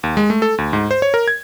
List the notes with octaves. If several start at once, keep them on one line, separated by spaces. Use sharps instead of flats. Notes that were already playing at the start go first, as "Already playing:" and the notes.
D#2
G#3
A3
A4
D2
G#2
C5
C#5
A#4
G#6